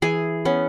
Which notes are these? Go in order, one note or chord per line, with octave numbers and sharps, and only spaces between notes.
E3 G#4
B3 C#4